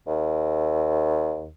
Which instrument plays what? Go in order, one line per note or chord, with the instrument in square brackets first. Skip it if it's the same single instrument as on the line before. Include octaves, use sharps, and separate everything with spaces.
[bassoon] D#2